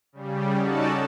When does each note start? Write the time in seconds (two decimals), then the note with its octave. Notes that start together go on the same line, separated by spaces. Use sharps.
0.12 C#3 G3
0.58 C#4 D#4 F#4 A4 D5 A5